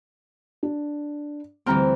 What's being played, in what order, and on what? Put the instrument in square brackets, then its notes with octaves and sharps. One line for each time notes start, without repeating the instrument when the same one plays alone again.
[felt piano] D4
[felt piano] D2 A#5 F6 [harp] E3 G3 C4